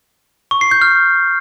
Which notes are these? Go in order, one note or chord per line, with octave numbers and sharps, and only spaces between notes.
C#6
C7
G6
F6